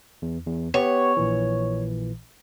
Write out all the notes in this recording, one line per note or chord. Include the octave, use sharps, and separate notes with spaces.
E2
E2
B3 G4 C#5
A#1 A#2 E3